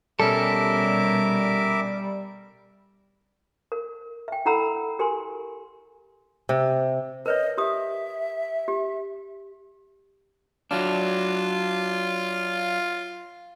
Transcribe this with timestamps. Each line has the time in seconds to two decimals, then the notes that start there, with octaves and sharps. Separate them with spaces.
0.20 B2 G3 C#4 A4 A#4 E5 D6
3.72 A#4
4.28 E5 G5
4.46 E4 A4 F#5 A#5 B5 E6
4.99 G4 A#4 G#5 C6
6.49 C3
7.26 A#4 B4 C#5 D#5
7.58 G4 E5 D#6
8.68 G4
10.71 F#3 D4 F4